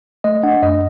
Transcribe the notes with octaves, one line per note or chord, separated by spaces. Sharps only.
A3 D#5
D4 F#5
F#2 D#5